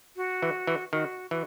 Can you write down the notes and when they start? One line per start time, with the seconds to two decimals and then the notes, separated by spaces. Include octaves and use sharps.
0.16 F#4
0.42 E3
0.67 E3
0.93 D#3 F#4
1.31 E3 F#4